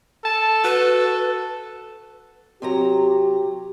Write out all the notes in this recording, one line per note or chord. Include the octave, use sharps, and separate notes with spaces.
A4 A5
F#4 B4
C3 F#3 G4 A#5